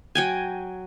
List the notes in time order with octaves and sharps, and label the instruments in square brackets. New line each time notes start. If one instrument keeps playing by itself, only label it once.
[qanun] F#3 G5 G#5